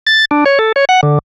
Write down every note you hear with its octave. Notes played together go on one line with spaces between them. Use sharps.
A6
D4
C#5
A4
C#5
F#5
D3